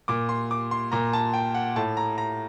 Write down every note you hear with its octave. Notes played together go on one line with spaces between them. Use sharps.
A#2 D6
C6
D6
C6
A#2 A#5
A5
G5
F#5
A2 A5
A#5
A#5